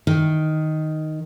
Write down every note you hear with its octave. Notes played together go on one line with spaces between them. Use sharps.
D#3